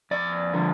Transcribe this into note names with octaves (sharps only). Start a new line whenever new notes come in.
F2 D5
D3 F3